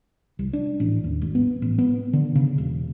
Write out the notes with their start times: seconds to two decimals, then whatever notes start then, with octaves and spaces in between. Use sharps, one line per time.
0.39 C2
0.53 D4
0.80 A1
1.04 D#2
1.21 G#1
1.35 B3
1.62 A1
1.78 B3
2.13 D3
2.35 C#3
2.58 E1